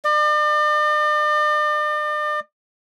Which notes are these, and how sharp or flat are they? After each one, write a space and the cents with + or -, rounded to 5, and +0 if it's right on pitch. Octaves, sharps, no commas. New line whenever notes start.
D5 +40